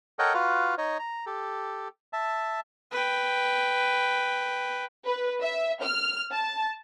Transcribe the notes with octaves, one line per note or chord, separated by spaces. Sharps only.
A4 A#4 C#5 D#5 F#5 G5
F4 F#4 B4 F5
D#4 C#5 D#5
A#5
G4 A4
E5 A5
B4 G5
B4
E5
F6
A5